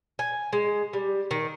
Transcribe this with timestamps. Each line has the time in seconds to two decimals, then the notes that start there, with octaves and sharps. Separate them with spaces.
0.19 G#5
0.53 G#3
0.93 G3
1.31 D#3